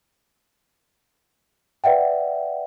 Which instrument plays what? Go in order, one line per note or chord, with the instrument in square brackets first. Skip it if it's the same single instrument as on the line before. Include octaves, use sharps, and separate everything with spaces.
[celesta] B4 D5 E5 F#5 G5